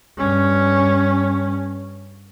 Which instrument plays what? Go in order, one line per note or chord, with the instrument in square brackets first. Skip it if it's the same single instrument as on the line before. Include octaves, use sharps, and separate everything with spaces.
[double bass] G2 C#4